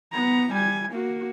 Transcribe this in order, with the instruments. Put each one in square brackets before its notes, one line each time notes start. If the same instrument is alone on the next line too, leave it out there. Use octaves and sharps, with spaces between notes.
[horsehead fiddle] B3 A#5
G3 G#5
A#3 F#4